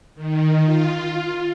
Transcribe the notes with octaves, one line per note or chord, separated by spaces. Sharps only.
D#3
F4